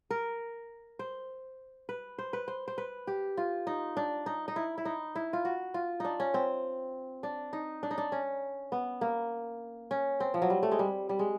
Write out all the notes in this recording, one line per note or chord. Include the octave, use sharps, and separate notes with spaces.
A#4
C5
B4
C5
B4
C5
C5
B4
G4
F4
D#4
D4
D#4
D#4
E4
E4
D#4
E4
F4
F#4
F4
D4 D#4
C#4
C4
D4
D#4
D4
D#4
D4
C#4
B3
A#3
C#4
C4
F3
F#3
G3
A3
G#3
G3
G3
G#3